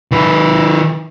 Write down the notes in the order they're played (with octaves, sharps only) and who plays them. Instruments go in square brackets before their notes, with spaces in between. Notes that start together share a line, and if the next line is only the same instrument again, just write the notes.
[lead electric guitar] D#3 B4